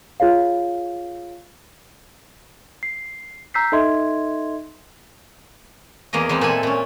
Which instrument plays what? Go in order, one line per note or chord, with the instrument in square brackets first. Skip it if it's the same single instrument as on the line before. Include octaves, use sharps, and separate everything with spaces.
[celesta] F4 G#4 C#5 F5
C7
A#5 E6 G6 B6 C7
D#4 A4 D#5 E5 C6 G#6
[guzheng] E2 A#3 G#4 D#5
E2 G3 G#3 C4
A#2 A4 E5 G#5
A#2 C#4